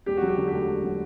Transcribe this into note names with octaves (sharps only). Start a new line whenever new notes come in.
E1 G4
F#4
F#3
G4
D3
D2 G4
E1
F#3